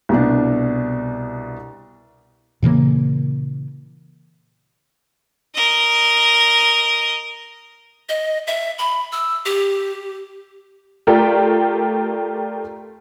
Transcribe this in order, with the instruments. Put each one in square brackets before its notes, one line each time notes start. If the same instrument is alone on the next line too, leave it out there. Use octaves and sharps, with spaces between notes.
[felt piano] C2 B2 D4
[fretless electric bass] A#2 C#3 E3 A#3
[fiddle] A#4 D#5
[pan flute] D#5
E5
B5
E6
G4
[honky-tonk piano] A3 F4 G4 A#4 D5 G5